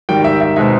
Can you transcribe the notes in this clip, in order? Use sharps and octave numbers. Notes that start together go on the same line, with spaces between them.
G#2 D#3 G3 G5
E5
E5
B2 G#3 C4 D#4 E5